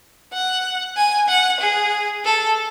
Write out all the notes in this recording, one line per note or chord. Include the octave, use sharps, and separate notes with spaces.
F#5
G#5
F#5
G#4
A4